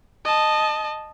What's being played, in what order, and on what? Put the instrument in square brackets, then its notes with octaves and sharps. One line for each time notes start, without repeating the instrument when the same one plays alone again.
[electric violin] D#5 A5